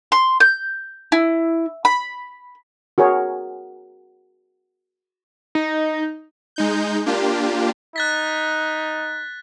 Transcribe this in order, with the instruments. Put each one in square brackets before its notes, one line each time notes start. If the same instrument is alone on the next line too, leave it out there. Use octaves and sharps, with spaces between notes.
[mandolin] C6
G6
E4
B5
[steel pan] F#4 G#4 A#4 C#5
[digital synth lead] D#4
[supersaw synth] G#3 D#4 G6
A#3 D4 F4 G4
[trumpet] D#4 [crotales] F#6 A6 B6